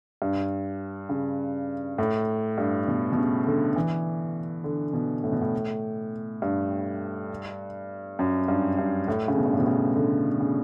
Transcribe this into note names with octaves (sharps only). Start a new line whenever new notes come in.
G2
C#3
A2
G2
B2
B2
C#3
D3
E3
D3
B2
A2
B2
A2
G2
F#2
G2
G2
A2
C#3
B2
G2
A2
B2
C#3
D3
C#3